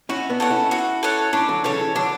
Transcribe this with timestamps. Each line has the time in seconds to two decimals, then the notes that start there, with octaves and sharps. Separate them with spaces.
0.09 C#4 E4 F#4
0.30 B3 D4
0.40 A4 C#5 F#5
0.50 C#4 E4
0.71 F#4
1.03 A4 C#5 F#5
1.33 C#4 D4 E4
1.48 D3 F#3
1.64 C#3 E3 A4 C#5
1.79 C#3 E3
1.95 D3 F#3 D4